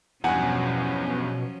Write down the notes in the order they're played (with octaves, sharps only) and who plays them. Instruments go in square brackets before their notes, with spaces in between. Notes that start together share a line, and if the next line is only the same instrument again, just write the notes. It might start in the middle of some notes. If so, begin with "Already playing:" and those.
[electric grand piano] E2 G2 [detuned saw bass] B2 [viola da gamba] F3 F#3 C#4 [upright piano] F#5 G#5